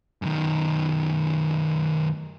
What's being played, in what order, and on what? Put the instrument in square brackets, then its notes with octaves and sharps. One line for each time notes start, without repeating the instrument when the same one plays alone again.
[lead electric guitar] F#2 D#3